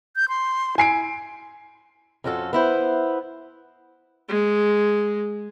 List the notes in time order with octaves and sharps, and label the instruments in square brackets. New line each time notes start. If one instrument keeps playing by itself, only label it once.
[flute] G6
C6
[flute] E4 [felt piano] G#5 C7 D7
[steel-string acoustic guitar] F2 C#4 F4 F#4 A4
B3 E4 C5
[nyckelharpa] G#3